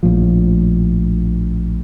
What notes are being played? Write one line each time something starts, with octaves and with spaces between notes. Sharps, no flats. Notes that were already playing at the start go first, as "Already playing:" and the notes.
A#1 A2 F3